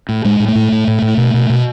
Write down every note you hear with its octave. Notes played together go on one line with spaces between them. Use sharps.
A2
A2 G#3
A2
A3
A2
A2
A2
A2
B2
B2
B2